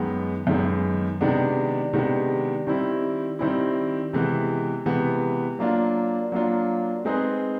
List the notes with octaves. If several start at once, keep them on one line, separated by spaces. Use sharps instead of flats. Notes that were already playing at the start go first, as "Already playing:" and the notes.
Already playing: F#2 D#3 G#3 B3
F#2 D#3 G#3 B3
C3 D#3 G#3 B3 D4
C3 D#3 G#3 B3 D4
D#3 G3 C4 E4
D#3 G3 C4 E4
C3 E3 G#3 B3
C3 E3 G#3 B3
F#3 A#3 D4 F4
F#3 A#3 D4 F4
G#3 C4 D#4 G#4 B4